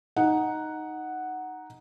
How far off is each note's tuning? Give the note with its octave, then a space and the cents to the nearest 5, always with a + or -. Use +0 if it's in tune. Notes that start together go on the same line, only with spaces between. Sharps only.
D#4 +0 F#5 +0